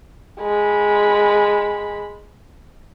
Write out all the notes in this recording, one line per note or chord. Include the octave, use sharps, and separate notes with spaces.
G#3 B5